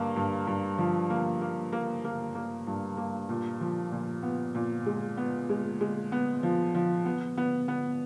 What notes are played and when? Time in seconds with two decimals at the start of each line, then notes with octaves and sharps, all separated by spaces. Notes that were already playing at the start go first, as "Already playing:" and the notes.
Already playing: G2 A#3
0.16 G2
0.47 G2
0.78 F3
1.10 A#3
1.41 A#3
1.72 A#3
2.04 A#3
2.35 A#3
2.67 G2
2.97 A#3
3.29 A#2
3.61 F3
3.92 A#2
4.23 B3
4.55 A#2
4.86 G#3
5.17 B3
5.49 G#3
5.81 G#3
6.12 B3
6.43 F3
6.75 F3
7.05 B3
7.37 B3
7.68 B3